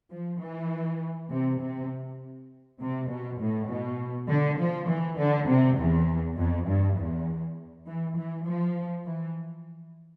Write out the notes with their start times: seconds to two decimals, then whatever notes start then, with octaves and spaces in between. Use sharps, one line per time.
0.11 F3
0.41 E3
1.30 C3
1.61 C3
2.80 C3
3.09 B2
3.40 A2
3.69 B2
4.29 D3
4.58 F3
4.89 E3
5.18 D3
5.48 C3
5.78 E2
6.37 F2
6.67 G2
6.97 E2
7.87 E3
8.17 E3
8.46 F3
9.06 E3